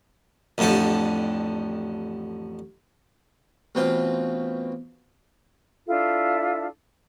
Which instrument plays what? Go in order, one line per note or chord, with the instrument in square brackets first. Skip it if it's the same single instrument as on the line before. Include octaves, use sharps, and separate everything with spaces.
[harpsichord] A1 F2 D3 D4 G4
A1 B2 C4 F4 G5
[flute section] D4 E4 F4 A4